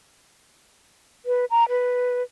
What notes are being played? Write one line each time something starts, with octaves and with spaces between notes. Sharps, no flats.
B4
A#5
B4